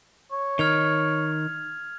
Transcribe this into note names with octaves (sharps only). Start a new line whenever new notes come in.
C#5
D#3 F6 G#6 F7